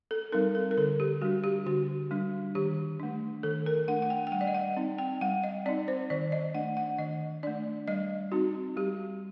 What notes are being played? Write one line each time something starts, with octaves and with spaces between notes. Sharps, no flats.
A4
G3 C4 D#4 A#4
A4
A#4
D3 A4
G4
G3 D4 F#4
G4
D3 F#4
G3 D4
D#3 G4
A3 D4
D#3 A4
A#4
A3 D4 F#5
F#5
G5
G5
G3 F#5
D5
D#5
F#5
C4 D#4
G5
G3 F#5
D#5
C4 D#4 D5
C5
D#3 D5
D#5
A3 D4 F#5
F#5
D#3 D#5
A3 D4 D5
G3 D#5
C4 D#4 F#4
G3 G4